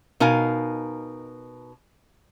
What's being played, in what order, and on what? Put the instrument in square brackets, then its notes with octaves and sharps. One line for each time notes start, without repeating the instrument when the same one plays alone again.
[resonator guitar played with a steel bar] B2 D#4 A#4 F5 G#5